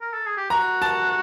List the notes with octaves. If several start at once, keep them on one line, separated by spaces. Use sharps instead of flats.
A#4
A4
G#4
G4
F#4 A#5
A5